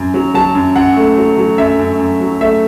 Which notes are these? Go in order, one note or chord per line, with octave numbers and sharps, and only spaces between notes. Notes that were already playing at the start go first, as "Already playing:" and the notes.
Already playing: F#2
F#3
F#3 A5
F#2
F#2 F#5
A3
F#3
F#3
F#2 E5
F#2
F#2
F#3
A3 E5